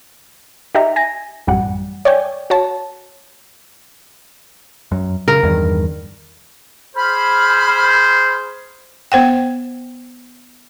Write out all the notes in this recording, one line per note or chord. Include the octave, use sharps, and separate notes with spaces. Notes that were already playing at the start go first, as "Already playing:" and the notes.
D#4 G4 E5 A#5
G#5 A#6
A1 F#2 G3 F#5
C#5 D5 G5 G#5
F#4 C#5 A5
F#2
C#3 A#4
E2 G2 D#3
G#4 C5 B5 F6
B3 C5 F#5 G5